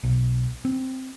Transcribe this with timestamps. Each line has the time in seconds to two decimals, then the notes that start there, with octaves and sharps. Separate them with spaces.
0.04 B1
0.65 C4